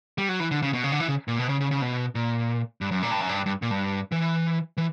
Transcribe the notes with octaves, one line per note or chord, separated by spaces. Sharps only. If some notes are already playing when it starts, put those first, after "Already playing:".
G3
F#3
E3
D3
C#3
B2
C#3
D3
E3
C#3
A#2
B2
C#3
C#3
C#3
B2
A#2
G2
F#2
A#2
G2
F#2
G2
G2
A#2
G2
E3
E3